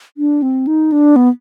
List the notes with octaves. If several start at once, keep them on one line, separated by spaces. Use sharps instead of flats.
D4
C4
D#4
D4
B3